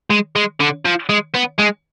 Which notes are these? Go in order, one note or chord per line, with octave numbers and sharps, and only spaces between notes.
G#3
G#3
D3
F3
G#3
B3
G#3